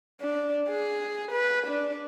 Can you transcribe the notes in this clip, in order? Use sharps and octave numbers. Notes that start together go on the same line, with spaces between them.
D4
G#4
B4
D4